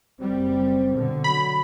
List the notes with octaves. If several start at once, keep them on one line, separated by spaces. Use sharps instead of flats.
F#1 G3 C4
B2 D3
F#3 B5